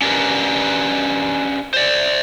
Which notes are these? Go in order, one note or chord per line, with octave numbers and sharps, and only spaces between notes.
C#4 D4 G4 G#4 A#4 B4
C5 D5